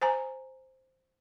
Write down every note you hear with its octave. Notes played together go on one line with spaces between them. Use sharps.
C5 G#5 A#5